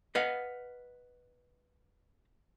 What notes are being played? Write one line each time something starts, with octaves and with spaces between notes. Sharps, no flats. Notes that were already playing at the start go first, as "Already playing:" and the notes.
B4 D#5 F5 F#5